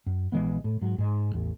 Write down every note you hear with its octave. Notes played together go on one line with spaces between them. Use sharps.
F#2
A#1 E3 G#3 B3
A2
G#2 F#3
G#2 G#3
A1 E2